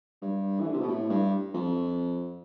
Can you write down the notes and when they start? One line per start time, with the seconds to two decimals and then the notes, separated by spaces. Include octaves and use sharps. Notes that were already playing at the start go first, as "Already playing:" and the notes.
0.22 G2
0.60 E3
0.67 D3
0.74 C3
0.81 B2
0.88 A2
1.10 G2
1.54 F2